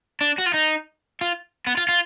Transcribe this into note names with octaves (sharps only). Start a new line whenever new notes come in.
D4
F#4
F4
D#4
F4
B3
F4
F4